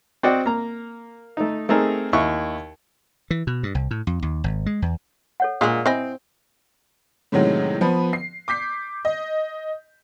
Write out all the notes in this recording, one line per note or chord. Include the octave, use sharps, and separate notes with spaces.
C4 F#4 D5 D#5 F#5 G5
A#3 A#5
A3 D#4
A3 C4 D#4 G#4 A#4
D#2 E4 C#6
E3
B2
G2
C2
A2
F2
D#2
G#1
G#3
E2
A4 C#5 F#5
A#2 G#3 D4 G#4 C#6
C4 E4 D#5 G#5
A2 C3 D#3 F#3 G#3 C#4
F3 B3 B4
C7
D6 G6 B6 C7
D#5